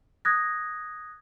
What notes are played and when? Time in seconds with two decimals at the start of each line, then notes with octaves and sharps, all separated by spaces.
0.25 D#6 F#6 G#6 A#6